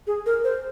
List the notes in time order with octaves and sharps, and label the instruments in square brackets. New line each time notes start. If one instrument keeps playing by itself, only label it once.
[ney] G#4
A#4
C5